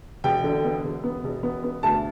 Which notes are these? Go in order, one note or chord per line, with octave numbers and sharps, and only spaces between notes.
E1 G5
D3
B3
E1
B3
E1
B3
B3
D2 A5